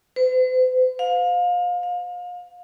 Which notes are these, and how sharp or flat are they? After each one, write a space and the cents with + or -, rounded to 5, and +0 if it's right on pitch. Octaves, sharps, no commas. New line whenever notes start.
C5 -45
F5 +30
F5 +35